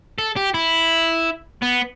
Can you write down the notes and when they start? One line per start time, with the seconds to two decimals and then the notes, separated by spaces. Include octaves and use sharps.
0.18 A4
0.36 G4
0.54 E4
1.62 B3